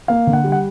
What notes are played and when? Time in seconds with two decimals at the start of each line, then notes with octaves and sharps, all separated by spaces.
0.08 A#3 F5
0.27 D3
0.33 F#5
0.44 G3
0.52 F#5